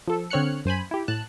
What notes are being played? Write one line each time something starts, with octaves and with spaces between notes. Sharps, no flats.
F3 A4
D3 C4 C#5 F6 F#6 C#7
F#2 C5 G#5 B5
E4 G4
A2 A5 F#6